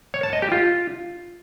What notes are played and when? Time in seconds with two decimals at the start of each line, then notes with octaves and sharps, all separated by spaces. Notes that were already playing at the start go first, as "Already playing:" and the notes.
0.14 C#5
0.23 A5
0.33 D#5
0.42 G4
0.52 F4